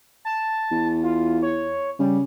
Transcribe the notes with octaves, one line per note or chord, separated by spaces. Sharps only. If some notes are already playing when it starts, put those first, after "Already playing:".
A5
E2
F4
C#5
C#3 G3